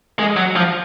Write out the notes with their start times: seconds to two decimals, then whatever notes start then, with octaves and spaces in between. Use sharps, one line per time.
0.19 G#3
0.36 F#3
0.56 F3